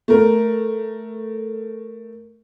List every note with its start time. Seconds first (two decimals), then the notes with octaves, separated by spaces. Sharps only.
0.08 A3 A#4